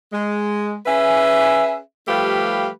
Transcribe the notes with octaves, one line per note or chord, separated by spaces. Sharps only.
G#3
C#4 G#4 B4 E5
F3 G3 A3 G4 B4 F5